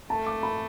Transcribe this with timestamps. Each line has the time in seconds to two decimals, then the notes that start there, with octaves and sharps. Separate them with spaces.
0.10 A3 A5
0.26 D6
0.43 B5